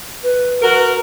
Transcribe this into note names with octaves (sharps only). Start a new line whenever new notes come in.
B4
F#4 A#4